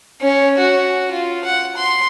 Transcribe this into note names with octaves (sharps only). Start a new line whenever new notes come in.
C#4
F#4
F4
F#5
C6